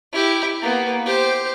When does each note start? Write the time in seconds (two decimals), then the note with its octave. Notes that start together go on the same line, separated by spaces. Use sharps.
0.13 E4 G4
0.62 A#3 B3
1.06 G4 C5